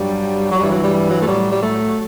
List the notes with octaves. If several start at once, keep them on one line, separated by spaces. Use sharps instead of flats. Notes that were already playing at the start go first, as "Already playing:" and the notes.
Already playing: G2 F#3 G3
F#3
G2 E3 G3
F#3
G3
G3
F#3
A3
A2 F#3 G3
G3
A3